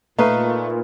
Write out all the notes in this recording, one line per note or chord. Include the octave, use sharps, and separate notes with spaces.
A#2 A3 D#4 B4 F5